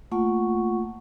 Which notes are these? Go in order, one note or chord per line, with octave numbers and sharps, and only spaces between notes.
A3 A#3 F4 F#5 C#6